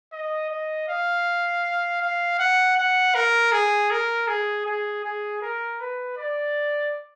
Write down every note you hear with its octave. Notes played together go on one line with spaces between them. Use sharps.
D#5
D#5
F5
F5
F#5
F#5
A#4
G#4
A#4
G#4
G#4
G#4
A#4
B4
D5